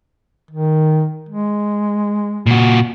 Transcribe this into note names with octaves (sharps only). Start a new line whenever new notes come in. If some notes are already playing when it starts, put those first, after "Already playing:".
D#3
G#3
A#2 F#4